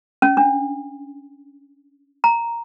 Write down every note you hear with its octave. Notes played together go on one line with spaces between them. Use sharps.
C#4
D4
A#5